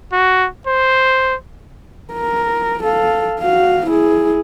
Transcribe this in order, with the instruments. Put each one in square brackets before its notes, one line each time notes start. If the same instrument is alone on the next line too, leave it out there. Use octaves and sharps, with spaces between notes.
[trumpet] F#4
C5
[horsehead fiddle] A#4
A4 F5
F#4 F5
E4 G#4